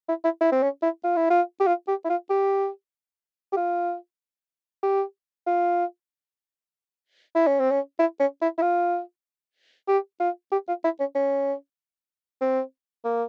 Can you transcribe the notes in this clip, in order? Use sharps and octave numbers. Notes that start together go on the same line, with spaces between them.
E4
E4
E4
C4
C#4
E4
F4
E4
F4
G4
F4
G4
E4
F4
G4
G4
F4
G4
F4
E4
C#4
C4
C#4
E4
C#4
E4
E4
F4
G4
F4
G4
F4
E4
C#4
C#4
C4
A#3